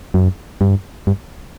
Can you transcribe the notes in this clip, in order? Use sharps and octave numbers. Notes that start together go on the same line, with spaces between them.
F#2
G2
G2